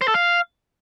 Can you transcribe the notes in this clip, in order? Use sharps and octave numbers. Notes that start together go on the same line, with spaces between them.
C5
A4
F5